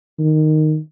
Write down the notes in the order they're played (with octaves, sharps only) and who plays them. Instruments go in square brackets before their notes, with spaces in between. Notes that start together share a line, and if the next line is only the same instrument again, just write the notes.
[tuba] D#3